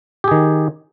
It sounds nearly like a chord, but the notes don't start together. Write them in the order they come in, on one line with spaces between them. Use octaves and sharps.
G4 G#4 D#3